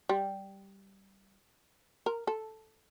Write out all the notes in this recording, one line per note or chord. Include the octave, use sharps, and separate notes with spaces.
G3
A#4
A4